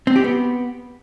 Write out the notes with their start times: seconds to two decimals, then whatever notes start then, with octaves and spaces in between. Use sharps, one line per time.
0.07 C4
0.16 G4
0.24 B3